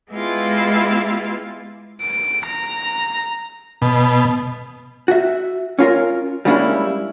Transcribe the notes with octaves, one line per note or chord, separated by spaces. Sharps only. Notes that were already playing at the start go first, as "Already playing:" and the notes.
G#3 B3 E4 F4 G4
D7
A#5
B2
F#4 E5
C#4 F4 A#4
G3 G#3 A#3 C#4 D4 E4